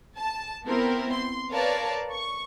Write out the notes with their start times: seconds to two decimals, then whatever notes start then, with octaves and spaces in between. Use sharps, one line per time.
0.17 A5
0.66 B3 C4 E4 A#4
1.13 C6
1.52 A#4 B4 C#5 D5 F5 A5
2.12 C#6